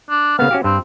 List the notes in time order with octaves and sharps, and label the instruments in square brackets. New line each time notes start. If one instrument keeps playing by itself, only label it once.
[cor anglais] D4
[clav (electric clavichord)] C#3 A#3 B3 [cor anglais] F5
[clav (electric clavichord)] C#4 F#4 G4
[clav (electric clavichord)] G2 [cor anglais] C4